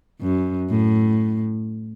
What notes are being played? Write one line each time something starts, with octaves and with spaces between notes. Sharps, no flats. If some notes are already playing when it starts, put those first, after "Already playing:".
F#2
A2